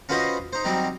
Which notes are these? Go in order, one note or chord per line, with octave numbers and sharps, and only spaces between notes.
C#4 F4 F#4 B4 C5 D#5
D#4 C5
F#3 G3 C4 D#4